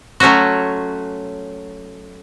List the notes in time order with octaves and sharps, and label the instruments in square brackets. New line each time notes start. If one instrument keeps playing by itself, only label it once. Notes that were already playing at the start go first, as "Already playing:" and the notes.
[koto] F#3 A3 C#4 F4 F#4